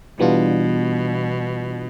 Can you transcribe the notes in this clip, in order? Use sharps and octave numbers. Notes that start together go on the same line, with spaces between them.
B2 E3 G3 B3 D4 F4